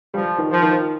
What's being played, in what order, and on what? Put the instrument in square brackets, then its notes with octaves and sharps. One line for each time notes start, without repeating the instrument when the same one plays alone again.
[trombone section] F3 [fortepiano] G3
[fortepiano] D#3
[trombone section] F3
[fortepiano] D#3